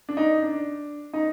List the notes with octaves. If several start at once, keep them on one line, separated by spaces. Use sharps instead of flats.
D4
D#4
D4
D#4